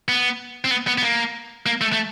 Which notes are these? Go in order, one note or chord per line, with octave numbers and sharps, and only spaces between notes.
B3
C4
B3
B3
B3
A#3
A#3
A3
A3